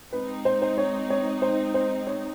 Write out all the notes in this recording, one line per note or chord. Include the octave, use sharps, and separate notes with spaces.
G#3 C4 D#4 B4
C5
C5
C#5
C#5
C5
C5
C#5